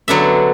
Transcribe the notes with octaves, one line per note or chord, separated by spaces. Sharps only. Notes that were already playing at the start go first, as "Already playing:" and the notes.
D3 F#3 B3 D4 E5